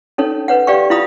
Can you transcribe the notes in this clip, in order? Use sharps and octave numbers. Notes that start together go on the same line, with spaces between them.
C#4 D#4 A4 C#5
B4 C#5 F#5
G4 D5 F5 G5 C#6
E4 F4 F5 B5 D#6